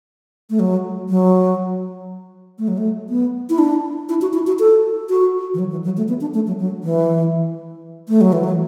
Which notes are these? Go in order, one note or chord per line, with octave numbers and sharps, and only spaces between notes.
A3
F#3
F#3
A3
F#3
A3
B3
E4
D4
E4
F#4
E4
F#4
A4
F#4
E3
F#3
E3
F#3
A3
B3
D4
A3
F#3
F#3
E3
A3
F#3
E3
F#3